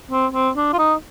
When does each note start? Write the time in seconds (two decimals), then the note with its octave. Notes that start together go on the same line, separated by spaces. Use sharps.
0.11 C4
0.34 C4
0.56 D4
0.73 F4
0.78 D#4